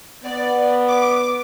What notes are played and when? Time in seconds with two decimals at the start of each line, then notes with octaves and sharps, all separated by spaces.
0.23 B3 D5
0.88 D6